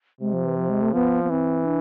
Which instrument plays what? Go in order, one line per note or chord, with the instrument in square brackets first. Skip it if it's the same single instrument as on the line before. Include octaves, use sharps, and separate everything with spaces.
[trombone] C3 [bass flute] G#3
[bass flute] F3
E3
F3
G#3
A3
[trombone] F3 [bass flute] B3
[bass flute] B3
[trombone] E3 [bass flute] C4
[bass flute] D4